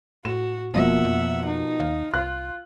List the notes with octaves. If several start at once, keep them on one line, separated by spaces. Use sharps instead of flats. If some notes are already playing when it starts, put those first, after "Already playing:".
A2 F#4 E7
F1 B2 F3 A#3 E5 F#5
F2
D#4
D#2 F5
C2 F4 F#6